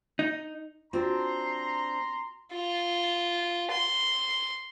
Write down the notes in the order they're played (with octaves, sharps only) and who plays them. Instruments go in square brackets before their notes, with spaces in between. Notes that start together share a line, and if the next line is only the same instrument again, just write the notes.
[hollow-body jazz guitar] D#4
[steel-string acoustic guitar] C4 D4 [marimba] F4 F#4 [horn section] A#5 C6
[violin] F4
C6